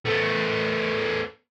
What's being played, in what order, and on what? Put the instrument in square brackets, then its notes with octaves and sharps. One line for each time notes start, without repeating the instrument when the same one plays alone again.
[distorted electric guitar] A3 B3